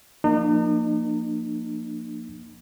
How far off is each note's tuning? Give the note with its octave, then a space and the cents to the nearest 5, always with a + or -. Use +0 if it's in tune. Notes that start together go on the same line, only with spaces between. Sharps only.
F3 +0 A#3 +0 D#4 -40